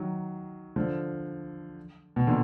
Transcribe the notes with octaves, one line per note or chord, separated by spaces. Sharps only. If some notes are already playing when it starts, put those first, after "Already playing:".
Already playing: D#3 F#3
D3 F3
B2
A#2 D3